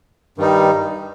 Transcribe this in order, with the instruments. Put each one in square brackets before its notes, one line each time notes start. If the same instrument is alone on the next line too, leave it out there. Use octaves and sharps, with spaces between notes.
[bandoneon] G2 D#3 G3 D#4